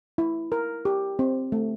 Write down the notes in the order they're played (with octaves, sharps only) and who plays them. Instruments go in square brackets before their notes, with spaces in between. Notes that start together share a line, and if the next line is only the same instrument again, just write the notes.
[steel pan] E4
A#4
G4
C4
A3